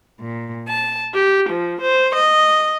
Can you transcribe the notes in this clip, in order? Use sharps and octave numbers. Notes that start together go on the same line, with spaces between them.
A#2
A5
G4
F3
C5
D#5